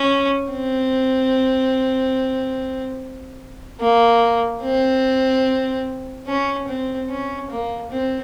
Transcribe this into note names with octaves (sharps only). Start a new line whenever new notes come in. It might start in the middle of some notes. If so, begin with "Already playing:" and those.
Already playing: C#4
C4
A#3
C4
C#4
C4
C#4
A#3
C4